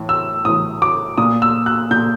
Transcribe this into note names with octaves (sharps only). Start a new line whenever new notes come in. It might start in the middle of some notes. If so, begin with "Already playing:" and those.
Already playing: A2 E3
E6
A2 E3 D#6
D6
A#2 D#6
E6
F#6
A#2 G6